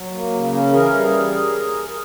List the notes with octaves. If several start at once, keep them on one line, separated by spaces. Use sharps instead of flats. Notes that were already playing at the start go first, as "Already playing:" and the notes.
Already playing: F#3
A#3
C#3
C#4
E3 G#4 A#4
G3